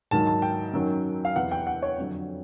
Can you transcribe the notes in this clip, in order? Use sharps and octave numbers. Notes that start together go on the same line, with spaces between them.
G#2 D#3 F#3 A5
A5
G5
F#2 D#3 F#3
F5
E2 C3 E3 F#5
G5
F#5
C#5
F2 D3 F#3